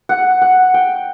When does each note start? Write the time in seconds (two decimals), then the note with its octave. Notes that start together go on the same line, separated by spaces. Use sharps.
0.09 F#5
0.42 F#5
0.74 G5